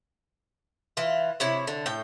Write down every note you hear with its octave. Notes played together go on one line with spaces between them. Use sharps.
E3 F4
C3 E4 C#5
D3
A2 G5